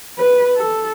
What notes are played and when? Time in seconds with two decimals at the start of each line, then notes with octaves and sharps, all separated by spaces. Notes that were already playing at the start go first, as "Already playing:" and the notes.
0.19 B4
0.57 A4